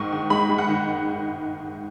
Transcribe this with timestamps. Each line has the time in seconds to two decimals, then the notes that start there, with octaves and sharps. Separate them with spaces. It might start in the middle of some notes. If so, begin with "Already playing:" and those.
Already playing: G#2 D#3 C#6
0.12 D#3
0.30 G#3 B5
0.49 G#3
0.58 F#5
0.69 D#3